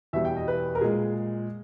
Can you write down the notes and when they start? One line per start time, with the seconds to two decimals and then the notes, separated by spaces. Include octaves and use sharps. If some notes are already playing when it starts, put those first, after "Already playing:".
0.13 E2 B2 G3 E5
0.25 G5
0.37 D#5
0.48 B4
0.75 A#4
0.81 A#2 G#3 G#4